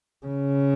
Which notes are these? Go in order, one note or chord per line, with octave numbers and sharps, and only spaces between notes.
C#3